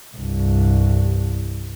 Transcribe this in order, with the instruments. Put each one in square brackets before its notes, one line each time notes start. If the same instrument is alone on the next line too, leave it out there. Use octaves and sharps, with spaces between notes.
[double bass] C2 G2